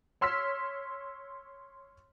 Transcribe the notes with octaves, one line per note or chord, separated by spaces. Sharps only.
C#5 C6 E6 F6 B6